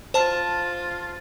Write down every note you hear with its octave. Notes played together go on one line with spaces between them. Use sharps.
F4 C5 A5